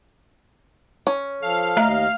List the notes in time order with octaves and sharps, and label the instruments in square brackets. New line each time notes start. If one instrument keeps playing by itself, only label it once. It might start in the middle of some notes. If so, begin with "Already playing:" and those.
[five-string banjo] C#4
[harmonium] F3 A4 [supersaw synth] F5 F6
[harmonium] D#2 D#5 [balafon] A3 E5 A#5